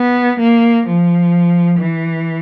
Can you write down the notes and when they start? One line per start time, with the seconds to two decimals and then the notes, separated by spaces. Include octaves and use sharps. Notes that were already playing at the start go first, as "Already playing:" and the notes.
Already playing: B3
0.39 A#3
0.87 F3
1.80 E3